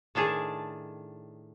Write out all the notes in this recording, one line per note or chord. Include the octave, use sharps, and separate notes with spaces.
A2 D#3 D4 G#4 A5